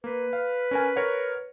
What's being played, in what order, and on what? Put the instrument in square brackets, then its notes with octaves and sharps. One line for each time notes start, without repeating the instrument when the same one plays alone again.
[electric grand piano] A#3 [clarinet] B4
[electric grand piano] F5
C#4 A#4 G#5
A#4 C#5 F#5